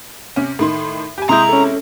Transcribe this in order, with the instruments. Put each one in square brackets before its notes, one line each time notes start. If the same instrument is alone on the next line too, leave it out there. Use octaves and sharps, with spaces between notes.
[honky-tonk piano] C3 C#4
A2 D#3 C6
G4 G#5
[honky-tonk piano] C3 G#3 E4 [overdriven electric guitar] A#5 [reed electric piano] C6 D#6 G6
[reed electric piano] C#4 A4